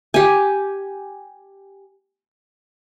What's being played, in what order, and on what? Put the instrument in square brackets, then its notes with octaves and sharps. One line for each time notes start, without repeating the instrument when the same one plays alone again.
[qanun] G4 G#5